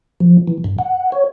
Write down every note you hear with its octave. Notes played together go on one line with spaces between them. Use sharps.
F3
E3
G2
F#5
C#5